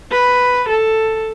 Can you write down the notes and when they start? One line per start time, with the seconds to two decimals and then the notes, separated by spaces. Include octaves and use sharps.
0.11 B4
0.68 A4